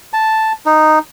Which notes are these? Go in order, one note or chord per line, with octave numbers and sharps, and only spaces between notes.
A5
D#4